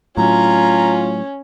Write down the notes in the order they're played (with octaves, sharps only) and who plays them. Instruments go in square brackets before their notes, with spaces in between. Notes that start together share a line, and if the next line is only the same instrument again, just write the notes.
[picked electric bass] A2 F#3 [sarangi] C#4 [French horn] F4 [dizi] A#5